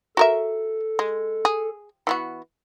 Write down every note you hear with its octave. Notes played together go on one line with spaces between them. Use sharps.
F#4 A4 A#4 E5
G#3
G#4
E3 B3 F#4